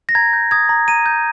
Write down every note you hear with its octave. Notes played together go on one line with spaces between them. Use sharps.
A#6
A#5 G#6
G6
D#6 G#6
A#5
A#5 D#7
G6